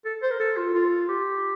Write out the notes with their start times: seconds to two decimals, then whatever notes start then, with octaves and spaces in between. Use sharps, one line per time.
0.05 A4
0.23 C5
0.31 A#4
0.40 A4
0.57 F4
0.74 F4
1.09 G4